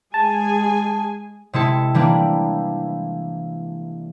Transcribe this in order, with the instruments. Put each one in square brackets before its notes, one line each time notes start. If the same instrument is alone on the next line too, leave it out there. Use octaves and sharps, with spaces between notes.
[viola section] G#3 G#4 G#5 [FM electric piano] A5
[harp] C3 G#3 E4 A4
E3 G3 A#3 D4